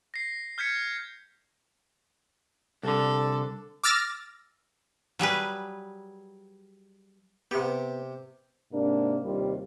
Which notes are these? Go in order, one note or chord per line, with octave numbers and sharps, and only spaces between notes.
A#6 C7
F6 G6 G#6 B6 C#7
C2 D3 A4
D6 E6 F6 A6 A#6
F#3 G3 G#4 B4
C3 B3 G4
G#2 C3 A#3 D4
D#2 C3 G3 F4